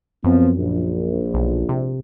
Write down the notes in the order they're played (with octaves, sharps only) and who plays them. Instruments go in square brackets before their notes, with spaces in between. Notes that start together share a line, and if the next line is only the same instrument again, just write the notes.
[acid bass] F#2 [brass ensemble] F3 B3 C4
[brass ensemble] A#1
[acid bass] B1
C3